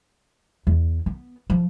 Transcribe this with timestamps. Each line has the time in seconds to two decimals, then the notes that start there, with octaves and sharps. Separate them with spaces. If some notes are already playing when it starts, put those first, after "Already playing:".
0.67 E2
1.06 B3
1.50 F3